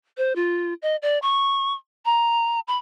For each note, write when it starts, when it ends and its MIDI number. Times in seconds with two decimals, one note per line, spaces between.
0.17 0.35 72
0.36 0.74 65
0.82 0.96 75
1.02 1.19 74
1.22 1.73 85
2.05 2.60 82
2.68 2.77 83